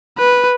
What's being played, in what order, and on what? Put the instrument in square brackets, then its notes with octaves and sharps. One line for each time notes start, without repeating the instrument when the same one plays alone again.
[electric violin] B4